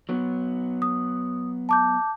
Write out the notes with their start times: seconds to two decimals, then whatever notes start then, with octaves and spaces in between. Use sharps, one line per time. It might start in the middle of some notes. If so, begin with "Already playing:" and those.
0.09 F#3 B3
0.82 D#6
1.69 A5 D6 G6